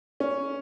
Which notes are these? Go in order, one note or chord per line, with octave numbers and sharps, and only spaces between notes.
C#4